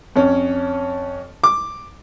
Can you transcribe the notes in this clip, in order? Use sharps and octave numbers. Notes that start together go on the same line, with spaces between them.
F2 C#4
D6